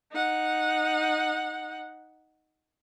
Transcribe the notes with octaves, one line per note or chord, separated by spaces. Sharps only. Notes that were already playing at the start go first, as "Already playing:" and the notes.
D#4 F#5